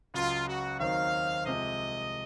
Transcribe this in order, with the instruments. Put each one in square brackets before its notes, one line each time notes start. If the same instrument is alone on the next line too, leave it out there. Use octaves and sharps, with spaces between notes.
[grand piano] C#2 C#3 F#3 [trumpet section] F4
[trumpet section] F#4
[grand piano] D#2 D#3 F#3 C4 D#4 [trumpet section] F5
[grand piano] C2 C3 F3 G#3 [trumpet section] D#5